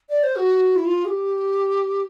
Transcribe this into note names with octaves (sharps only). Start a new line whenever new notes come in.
D5
C5
F#4
E4
F4
G#4
G4